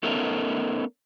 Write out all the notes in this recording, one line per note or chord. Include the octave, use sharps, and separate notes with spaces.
A3 B3 C#4 D#4 A4 A#4